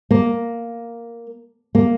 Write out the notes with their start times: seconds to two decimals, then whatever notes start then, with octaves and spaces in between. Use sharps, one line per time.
0.11 A#3
1.75 A#3